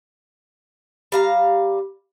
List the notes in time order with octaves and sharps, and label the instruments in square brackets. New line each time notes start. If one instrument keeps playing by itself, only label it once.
[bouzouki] G3 F5 A#5